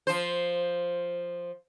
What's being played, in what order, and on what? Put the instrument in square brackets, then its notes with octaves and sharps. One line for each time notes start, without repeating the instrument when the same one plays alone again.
[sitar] F3 C5